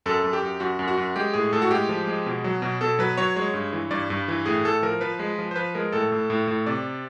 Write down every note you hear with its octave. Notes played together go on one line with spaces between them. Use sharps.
F#2 A4
F#2
G4
F#2
F#2 F#4
F#2
F#4
F#2
G#3 G4
A2 G#4
A2 A4
F#4
G#3 G4
F3
G#3
B2
F#3
B2
B2 A4
F#3 B4
F#3 C#5
G#3 C#5
G2
E3
G2 D5
G2
E3
A2 G#4
A2 A4
F3 A#4
F3 B4
G#3
F3
C5
F3 B4
G#3 A#4
A2 A4
A2
A2
A2
C3 D5